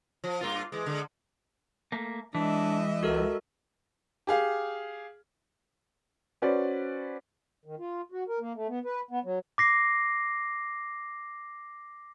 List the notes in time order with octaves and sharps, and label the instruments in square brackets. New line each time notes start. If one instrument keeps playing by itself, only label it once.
[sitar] F3
G2 A#3 F4
E3 G#3
D3 G#3
[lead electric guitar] A3 A#3
[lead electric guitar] E3 [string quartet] G#3 D#5 E5 [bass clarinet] D4
[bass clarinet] C#2 [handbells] F#4 A4 A#4
[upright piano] G4 G#4 F5
[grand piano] C#4 F#4 B4 C5 D5
[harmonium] D#3
F4
F#4
A#4
A#3
A3
B3
B4
B3
F#3
[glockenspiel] D6 A#6 C7